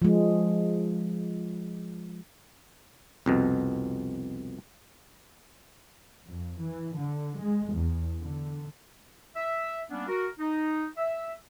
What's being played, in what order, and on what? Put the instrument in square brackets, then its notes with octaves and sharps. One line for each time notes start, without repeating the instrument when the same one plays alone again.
[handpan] F3 G#3
[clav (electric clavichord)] C2 F2 B2
[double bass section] F2
E3
D3
G#3
E2
D3
[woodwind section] E5
G3 A#3 B3 C#4 D4
F#4 A#4
D#4
E5